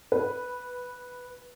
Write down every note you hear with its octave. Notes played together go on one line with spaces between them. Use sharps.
B4